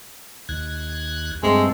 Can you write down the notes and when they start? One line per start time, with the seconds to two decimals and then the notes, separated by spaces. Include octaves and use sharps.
0.49 D#2 F#6 G#6
1.43 G2 G#3 A3 C4